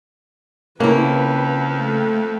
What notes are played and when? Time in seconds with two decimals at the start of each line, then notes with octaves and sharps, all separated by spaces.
0.80 F2 C#3 A#3 E4 B4
1.79 A3